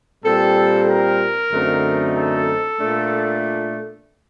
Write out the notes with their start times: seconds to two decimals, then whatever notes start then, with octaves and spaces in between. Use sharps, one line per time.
0.25 A#2 G3 C4 A4
0.88 A#4
1.52 F#2 D3 A3 C4 D#4
2.16 A4
2.79 A#2 A3 D4